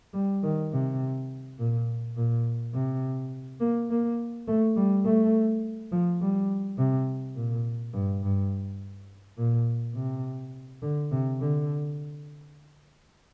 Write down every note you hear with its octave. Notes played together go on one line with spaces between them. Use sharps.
G3
D#3
C3
A#2
A#2
C3
A#3
A#3
A3
G3
A3
F3
G3
C3
A#2
G2
G2
A#2
C3
D3
C3
D3